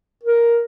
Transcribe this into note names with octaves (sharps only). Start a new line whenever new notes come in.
A#4